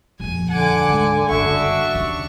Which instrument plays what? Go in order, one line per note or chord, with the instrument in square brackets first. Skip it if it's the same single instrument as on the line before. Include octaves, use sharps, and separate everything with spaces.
[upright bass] D#1 F2 [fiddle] G#5
[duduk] D3 [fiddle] F#5 D6 [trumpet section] G#5
[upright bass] D2 G#2
[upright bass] F#1 G2 [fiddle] D4 C#6 [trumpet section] F#4 E5
[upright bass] D#2 C#3